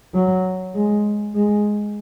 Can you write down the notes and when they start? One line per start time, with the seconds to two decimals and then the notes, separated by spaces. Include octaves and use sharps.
0.14 F#3
0.75 G#3
1.35 G#3